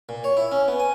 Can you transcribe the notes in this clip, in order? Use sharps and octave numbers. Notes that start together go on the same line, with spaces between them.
A#2
C#5
E4
C#4
B3
G#5